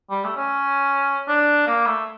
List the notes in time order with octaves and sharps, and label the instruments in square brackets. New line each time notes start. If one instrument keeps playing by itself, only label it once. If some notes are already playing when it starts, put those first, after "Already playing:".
[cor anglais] G3
A3
C#4
D4
A#3
A3